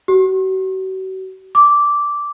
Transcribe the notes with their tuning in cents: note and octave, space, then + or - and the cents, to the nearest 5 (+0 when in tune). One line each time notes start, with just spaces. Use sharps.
F#4 +40
D6 -10